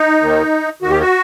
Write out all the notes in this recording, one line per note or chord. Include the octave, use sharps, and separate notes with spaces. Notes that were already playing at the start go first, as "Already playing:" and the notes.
Already playing: D#4
D#2 D#3
D#2 D#3 F#4
G4
F#4